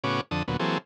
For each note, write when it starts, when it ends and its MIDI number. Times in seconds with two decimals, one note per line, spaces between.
0.04 0.21 45
0.04 0.21 49
0.04 0.21 59
0.04 0.21 61
0.04 0.21 66
0.04 0.21 86
0.31 0.43 41
0.31 0.43 50
0.31 0.43 69
0.31 0.43 87
0.48 0.57 38
0.48 0.57 46
0.48 0.57 54
0.48 0.57 59
0.60 0.78 52
0.60 0.78 54
0.60 0.78 58
0.60 0.78 60
0.60 0.78 68
0.60 0.78 69